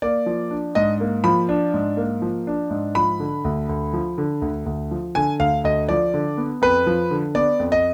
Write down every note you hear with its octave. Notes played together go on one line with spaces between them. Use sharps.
A#3 D5
F3
D4
G#2 D#5
A#3
F3 B5
D4
G#2
A#3
F3
D4
G#2
F3 B5
D3
D2
D2
F3
D3
D2
D2
F3
D3 G#5
D2 F5
D2 D#5
F3 D5
D3
B3
F2 B4
F3
D3
B3 D5
F2
D#5